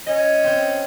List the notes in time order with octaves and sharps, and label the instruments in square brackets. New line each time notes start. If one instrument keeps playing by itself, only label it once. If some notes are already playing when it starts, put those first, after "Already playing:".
[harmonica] C#4 [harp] D#5
[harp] C4 C5